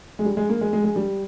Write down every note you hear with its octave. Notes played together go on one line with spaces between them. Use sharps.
G#3
G3
G#3
A#3
G#3
G#3
G#3
G3